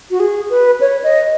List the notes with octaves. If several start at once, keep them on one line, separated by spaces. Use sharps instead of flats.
F#4
G#4
B4
C#5
D#5